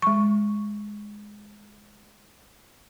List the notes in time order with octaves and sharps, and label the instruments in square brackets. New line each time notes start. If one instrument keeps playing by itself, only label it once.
[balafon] G#3 C#6